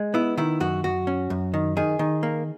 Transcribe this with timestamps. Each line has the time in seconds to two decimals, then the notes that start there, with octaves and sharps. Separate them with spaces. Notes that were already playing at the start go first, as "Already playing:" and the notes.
Already playing: G#3
0.14 B3 E4
0.37 D#3 E4
0.60 F#2 F#4
0.84 F#2 F#4
1.07 C#4
1.30 F#2
1.54 D#3
1.77 D#3 G#4
1.99 D#3
2.23 A#3